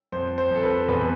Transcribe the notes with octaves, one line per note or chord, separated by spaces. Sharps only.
F2 C5
C5
F2 A4
B4
E2 B4